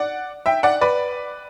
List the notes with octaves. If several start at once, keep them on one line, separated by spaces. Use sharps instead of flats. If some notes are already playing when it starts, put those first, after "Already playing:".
Already playing: D5 F#5
E5 G5
D5 F#5
B4 D5